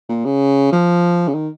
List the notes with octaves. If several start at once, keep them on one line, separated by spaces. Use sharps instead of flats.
A#2
C#3
F3
C#3
D#3